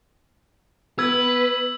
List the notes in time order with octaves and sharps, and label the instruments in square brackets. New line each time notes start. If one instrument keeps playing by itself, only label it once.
[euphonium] B3 [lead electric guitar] B4 [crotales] E6 G#6